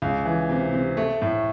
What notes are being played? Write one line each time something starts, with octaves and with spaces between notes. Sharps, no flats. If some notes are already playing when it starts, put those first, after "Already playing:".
C#2
E3
C3
C3
A3
A2